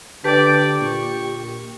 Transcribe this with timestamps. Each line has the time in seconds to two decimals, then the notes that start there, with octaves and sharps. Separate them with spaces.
0.24 D3 G4 B4 D5 G5 A5 G6
0.81 A#2 C#6